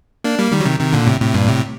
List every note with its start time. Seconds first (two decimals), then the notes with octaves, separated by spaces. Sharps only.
0.24 A#3 D4
0.39 G3 A#3
0.52 D#3 G3
0.60 F#3
0.65 C3 D#3
0.80 C3 D#3
0.93 A#2 D3
1.06 A2 C3
1.20 A2 C3
1.34 G2 A#2
1.48 A2 C3